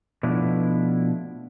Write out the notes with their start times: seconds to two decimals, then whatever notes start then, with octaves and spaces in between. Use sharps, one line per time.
0.23 B2 F3 A3 D4 E4